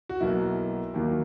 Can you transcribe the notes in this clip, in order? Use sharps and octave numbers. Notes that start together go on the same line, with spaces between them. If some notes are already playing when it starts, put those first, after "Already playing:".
F#4
B1 B2 F#3 A#3 E4
D#2 D#3 F#3 A#3